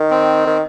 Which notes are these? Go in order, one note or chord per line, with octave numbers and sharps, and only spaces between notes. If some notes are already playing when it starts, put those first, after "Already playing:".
Already playing: D#3
C4
D#3